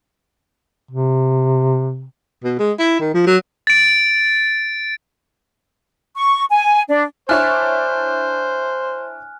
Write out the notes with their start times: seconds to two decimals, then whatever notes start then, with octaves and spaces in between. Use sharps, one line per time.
0.91 C3
2.44 B2
2.59 G#3
2.79 E4
3.00 D#3
3.14 F3
3.27 F#3
3.67 A6 D7
6.16 C#6
6.50 G#5
6.88 D4
7.29 D4 E4 C5 C#5 G#5 F6 F#6